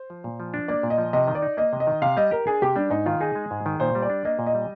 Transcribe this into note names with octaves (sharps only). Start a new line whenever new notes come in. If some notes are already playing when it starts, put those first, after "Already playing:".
Already playing: C5
F3
A#2
F3
D4
A#3 D5
A#2
D#5
F3
C3 D#5
D#3
D5
D#4
A#3 D#5
C3
D#5
D#3
C3 F5
G3 D#5
G4 A#4
D4 G#4
C3 G4
G3 D4
G#2 D#4
D#3 F4
D#4 G#4
G#3
G#2
D#3
A#2 C5
G3
D5
D4
A#3 D#5
A#2
D#5
G3